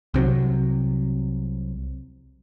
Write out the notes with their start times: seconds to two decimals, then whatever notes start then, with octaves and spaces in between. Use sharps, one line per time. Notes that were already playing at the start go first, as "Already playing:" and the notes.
0.14 C2 C3 D#3 F#3